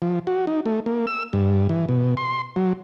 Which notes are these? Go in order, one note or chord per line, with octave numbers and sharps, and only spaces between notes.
F3
F#4
D#4
A3
A#3
E6
G2
E3
B2
C6
F#3